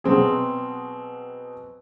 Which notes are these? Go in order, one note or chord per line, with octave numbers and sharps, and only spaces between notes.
B2 F#3 C4 G#4